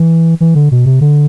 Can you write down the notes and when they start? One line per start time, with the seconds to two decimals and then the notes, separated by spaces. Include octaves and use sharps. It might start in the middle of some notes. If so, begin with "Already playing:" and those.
Already playing: E3
0.41 E3
0.55 D3
0.71 B2
0.86 C3
1.01 D3